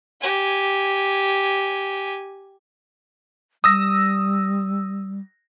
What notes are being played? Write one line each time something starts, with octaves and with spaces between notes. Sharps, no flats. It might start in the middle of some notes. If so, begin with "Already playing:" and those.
G4 G#5
G3 D#6 E6 A#6